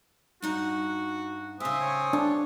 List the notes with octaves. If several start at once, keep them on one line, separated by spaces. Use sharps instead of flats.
G2 D#4 F#4 F#5
C#3 C4 G4 E5 G#5 D#6
C#5
B3 D4